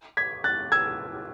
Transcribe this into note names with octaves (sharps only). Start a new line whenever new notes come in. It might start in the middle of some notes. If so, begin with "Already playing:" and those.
G#6 B6
F#6 A6
E6 G#6